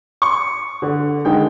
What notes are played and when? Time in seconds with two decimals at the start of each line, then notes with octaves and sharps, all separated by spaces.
0.22 C#6
0.82 D3
1.25 D3 D#3 G#3 G5